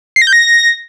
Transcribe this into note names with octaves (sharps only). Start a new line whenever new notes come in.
C7
A#6
G6
A#6